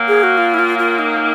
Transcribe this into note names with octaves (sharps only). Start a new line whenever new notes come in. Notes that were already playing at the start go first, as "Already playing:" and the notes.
Already playing: A#2 F#3 A#3
G#4
F#4
F4
E4
F4
F4
D#4